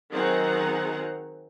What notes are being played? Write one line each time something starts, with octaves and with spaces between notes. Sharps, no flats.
D#3 F#3 C4 G#4 F#5 A#5